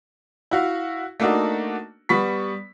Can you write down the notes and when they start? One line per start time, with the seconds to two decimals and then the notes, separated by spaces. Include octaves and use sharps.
0.51 E4 F#4 F5
1.20 A3 A#3 D4 D#4 F#4
2.09 G3 B3 B5 C#6 B6